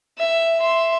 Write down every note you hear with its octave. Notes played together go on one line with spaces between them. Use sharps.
E5
E5 C6